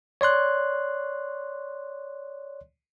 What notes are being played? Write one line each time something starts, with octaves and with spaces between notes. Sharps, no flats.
C#5 D5 C6 F#6